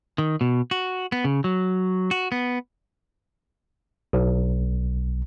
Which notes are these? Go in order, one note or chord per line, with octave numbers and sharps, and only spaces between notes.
D#3
B2
F#4
B3
C#3
F#3
F#4
B3
B1